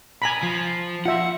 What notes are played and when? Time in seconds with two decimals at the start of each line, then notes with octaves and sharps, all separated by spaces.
0.22 G#5 A#5 B5
0.43 F3
1.06 F4 E5 F#5